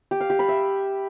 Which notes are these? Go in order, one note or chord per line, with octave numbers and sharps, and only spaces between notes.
G4
F5
G4
B5
E5